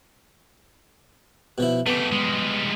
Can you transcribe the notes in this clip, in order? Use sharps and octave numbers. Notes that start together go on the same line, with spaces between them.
B2 F3 E4
A3 B3 G4
G3 G#3